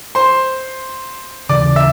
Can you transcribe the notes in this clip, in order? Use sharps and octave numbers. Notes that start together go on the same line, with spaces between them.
C5 C6
D#2 C#3 E3 D5 D6
E5 E6